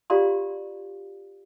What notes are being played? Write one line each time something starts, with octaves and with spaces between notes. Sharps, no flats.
F4 G4 D5 F5 A#5 C6